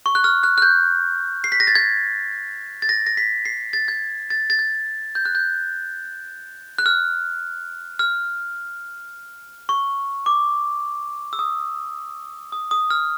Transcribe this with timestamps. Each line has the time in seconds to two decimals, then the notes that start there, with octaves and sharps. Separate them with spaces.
0.06 C#6
0.15 F#6
0.24 F6
0.43 F#6
0.58 F#6
0.62 G6
1.44 C7
1.52 B6
1.60 A#6
1.67 A6
1.75 G#6
2.82 A6
2.89 A#6
3.06 A#6
3.17 B6
3.45 C7
3.73 A6
3.88 G#6
4.30 A6
4.50 A6
4.59 G#6
5.15 G6
5.25 F#6
5.35 G6
6.78 F#6
6.86 F6
7.99 F6
9.69 C#6
10.26 D6
11.33 E6
11.39 D#6
12.52 D#6
12.71 D#6
12.90 F6